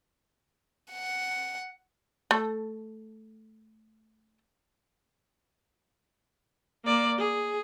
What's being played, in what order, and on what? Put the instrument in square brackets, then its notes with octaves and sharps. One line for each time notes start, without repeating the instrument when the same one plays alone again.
[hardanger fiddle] F#5
[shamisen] A3 A4
[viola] A#3 D5
G#4